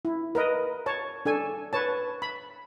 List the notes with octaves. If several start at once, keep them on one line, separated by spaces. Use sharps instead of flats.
E4
A#4 B4 D#5
C#5 A5
D4 A4 G#5
B4 C#5 A5
B5